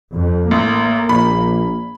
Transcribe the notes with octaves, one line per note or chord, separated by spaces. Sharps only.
F2
A1 A#3
A#1 B5